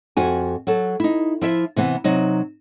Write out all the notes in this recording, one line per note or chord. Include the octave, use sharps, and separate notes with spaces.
F2 F#4 G#5
F#3 A4
D#4 E4
F3 E4 E5
C3 E3 B3
C3 F#3 D#4